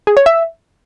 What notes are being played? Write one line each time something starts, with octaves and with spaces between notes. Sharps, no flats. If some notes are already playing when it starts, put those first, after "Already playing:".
G#4
C#5
E5